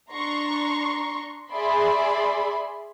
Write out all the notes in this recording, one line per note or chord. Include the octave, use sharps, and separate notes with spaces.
D4 A#5 C6 C#6
G#4 D5 E5 B5 C6